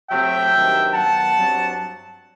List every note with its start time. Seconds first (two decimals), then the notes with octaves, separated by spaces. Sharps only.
0.11 C3 F#3 A3 C4 E5 G5
0.52 G2 D#3 F#3 C4
0.94 D#3 F#3 B3 F#5 A5
1.35 G2 F#3 C4